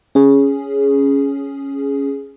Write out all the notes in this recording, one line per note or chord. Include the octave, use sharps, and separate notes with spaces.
C#4 G#4